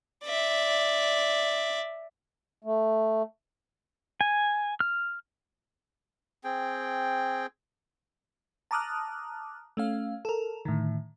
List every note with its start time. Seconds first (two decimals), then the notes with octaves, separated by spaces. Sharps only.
0.24 D5 E5
2.64 A3
4.21 G#5
4.80 F6
6.44 C4 G#4 G5
8.71 A5 A#5 D6 D#6 F6 F#6
9.77 A3 C#4 F5
10.25 A4 A#4
10.65 A2 D3 D#3